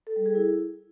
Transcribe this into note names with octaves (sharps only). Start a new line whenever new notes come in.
A4
G3
G#4
E4